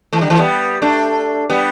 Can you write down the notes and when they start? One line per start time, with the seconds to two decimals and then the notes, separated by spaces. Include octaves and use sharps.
0.13 E3 A3
0.21 D3 G3
0.30 E3 A3
0.38 G3 B3
0.82 A3 D4
1.50 G3 B3